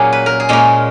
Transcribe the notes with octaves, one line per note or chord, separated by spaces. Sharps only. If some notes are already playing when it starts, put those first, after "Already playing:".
Already playing: A#2 F#3 A#3 C#4 G#4
B4
A#4
G#4
A#2 G#3 C#4 A#4